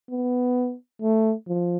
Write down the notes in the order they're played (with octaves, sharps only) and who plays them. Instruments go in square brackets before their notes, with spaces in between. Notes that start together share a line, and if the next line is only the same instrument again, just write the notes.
[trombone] B3
A3
F3